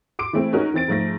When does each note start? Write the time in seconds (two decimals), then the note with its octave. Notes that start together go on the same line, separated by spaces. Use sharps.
0.19 C6 D6 D7
0.33 E3 G#3 A3 C4 E4
0.53 G#3 C#4 D#4 F#4 A#4
0.74 E3 C4 A6 D7
0.88 G#2 F3 A3 A#6